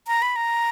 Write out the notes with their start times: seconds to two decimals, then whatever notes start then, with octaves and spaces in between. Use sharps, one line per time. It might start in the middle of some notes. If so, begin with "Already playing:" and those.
0.07 A#5
0.22 B5
0.36 A#5